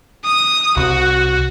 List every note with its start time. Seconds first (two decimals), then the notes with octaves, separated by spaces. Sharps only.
0.25 D#6
0.77 C2 F#4